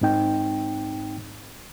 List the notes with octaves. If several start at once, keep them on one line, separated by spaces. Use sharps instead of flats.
G#2 C4 D#4 G5